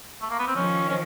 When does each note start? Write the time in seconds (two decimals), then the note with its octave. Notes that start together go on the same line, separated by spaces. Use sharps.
0.22 A3
0.30 A#3
0.39 B3
0.48 C4
0.56 D#3 F3 C#4
0.89 C#4